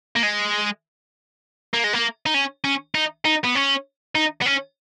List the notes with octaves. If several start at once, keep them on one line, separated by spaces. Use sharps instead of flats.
A#3
G#3
A#3
G#3
A#3
D#4
C#4
C#4
D#4
D#4
B3
C#4
D#4
B3
C#4